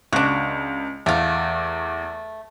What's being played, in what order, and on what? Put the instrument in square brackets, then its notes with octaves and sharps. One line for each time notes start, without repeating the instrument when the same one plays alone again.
[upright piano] C#2 [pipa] D4 F#4
[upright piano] E2 [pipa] A3 F5